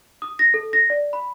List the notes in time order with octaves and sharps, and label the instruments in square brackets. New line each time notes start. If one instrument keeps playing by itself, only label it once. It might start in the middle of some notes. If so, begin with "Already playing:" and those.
[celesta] D#6
A#6
A4
A#6
D5
B5